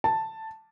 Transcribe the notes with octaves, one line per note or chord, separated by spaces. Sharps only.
A5